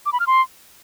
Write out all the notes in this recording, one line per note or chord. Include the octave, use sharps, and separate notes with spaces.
D6
B5
F6
C6